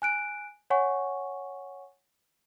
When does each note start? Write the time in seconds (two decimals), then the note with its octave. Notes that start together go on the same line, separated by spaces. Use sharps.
0.02 G#5 F#6 D7
0.70 C#5 F#5 G#5 C#6